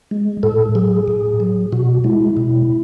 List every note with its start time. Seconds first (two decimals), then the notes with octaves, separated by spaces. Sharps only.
0.11 G#3
0.43 A2 A4
0.75 F#3 G#4
1.08 A2
1.40 F#3
1.72 B2 F#4
2.04 G#3 E4
2.37 B2